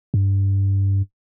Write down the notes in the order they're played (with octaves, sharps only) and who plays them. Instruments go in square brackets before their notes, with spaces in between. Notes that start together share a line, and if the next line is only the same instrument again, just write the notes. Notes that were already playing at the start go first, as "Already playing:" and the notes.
[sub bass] G2